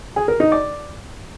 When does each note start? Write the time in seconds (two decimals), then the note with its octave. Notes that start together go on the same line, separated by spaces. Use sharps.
0.16 G#4
0.28 A#4
0.40 D#4
0.52 D5